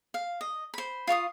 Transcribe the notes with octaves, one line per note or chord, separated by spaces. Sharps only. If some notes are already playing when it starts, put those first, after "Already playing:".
F5
D#5
C5 B5
F4 F5 C#6 D#6